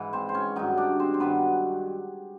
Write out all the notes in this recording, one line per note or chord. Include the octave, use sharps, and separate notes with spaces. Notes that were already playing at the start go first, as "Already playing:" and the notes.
Already playing: G#2 E3
C4 C5
C5
C#4 C#5
G2 D#3 F#3 D#4 D#5
D4 D5
C4 C5
C5
G2 D#3 F#3 B3 B4